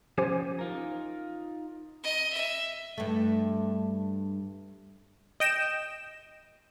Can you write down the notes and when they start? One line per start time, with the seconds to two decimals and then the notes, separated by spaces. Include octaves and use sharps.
0.18 F3 C#4 G4 C5 G#5
0.59 D#4 F4 A#4
2.03 D#5
2.33 E5
2.98 G2 A3
5.40 D#5 G5 E7